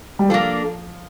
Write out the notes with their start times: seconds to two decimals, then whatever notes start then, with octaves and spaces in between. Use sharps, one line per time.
0.19 G3
0.29 F3 A#3 D4 A4